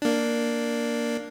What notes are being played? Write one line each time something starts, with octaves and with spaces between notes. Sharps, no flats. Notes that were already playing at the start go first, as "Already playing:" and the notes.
A#3 D4